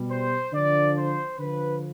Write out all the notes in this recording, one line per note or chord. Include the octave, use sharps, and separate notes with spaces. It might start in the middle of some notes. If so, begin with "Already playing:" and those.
Already playing: B2 G3
C5
D3 F3 D5
C5
D3 F3 B4